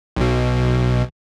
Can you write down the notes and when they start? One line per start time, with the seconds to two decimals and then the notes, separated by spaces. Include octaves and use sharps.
0.16 B1 B2